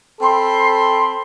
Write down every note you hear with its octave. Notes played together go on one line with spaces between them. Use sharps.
C4 A4 B5 C6